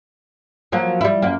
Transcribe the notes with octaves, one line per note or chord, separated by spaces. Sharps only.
F3 F#3 A#3
G3 E4
F#2 A#3